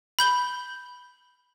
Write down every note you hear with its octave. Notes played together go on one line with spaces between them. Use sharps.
B5 G6 G7